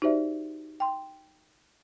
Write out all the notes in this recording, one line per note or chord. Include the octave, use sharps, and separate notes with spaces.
D#4 F#4 G4 C5 D5 E5
G5 C6